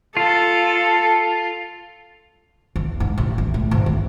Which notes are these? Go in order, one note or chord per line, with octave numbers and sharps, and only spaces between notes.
F4 A4
E2
G#2
A1
E2
A2
G#1
E2